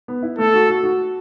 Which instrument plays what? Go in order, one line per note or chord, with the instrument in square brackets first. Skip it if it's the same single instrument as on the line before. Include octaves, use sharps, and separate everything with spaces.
[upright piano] B3
E4
[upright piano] A3 [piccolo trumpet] A4
[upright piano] F#4
F#4
F#4